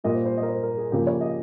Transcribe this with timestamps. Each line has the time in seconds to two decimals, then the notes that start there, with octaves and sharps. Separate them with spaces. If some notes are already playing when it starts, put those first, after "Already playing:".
0.04 A#2 G3 A#3 D#5
0.15 C5
0.26 C5
0.37 D#5
0.43 A#4
0.49 C5
0.63 A#4
0.78 G#4
0.92 C#3 F3 A#3 G4
1.07 C#5
1.21 D#5